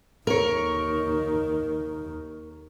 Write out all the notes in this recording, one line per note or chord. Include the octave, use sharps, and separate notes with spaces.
D#2 D#3 A#4 C#5